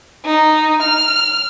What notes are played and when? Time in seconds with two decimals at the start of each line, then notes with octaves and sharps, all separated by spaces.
0.25 D#4
0.83 F6